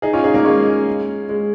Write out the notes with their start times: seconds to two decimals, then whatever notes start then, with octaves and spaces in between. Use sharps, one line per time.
0.02 D#4 G#4
0.13 C#4 F4
0.24 D#4 G#4
0.34 A#3 D#4
0.45 G#3 C#4
1.29 G#3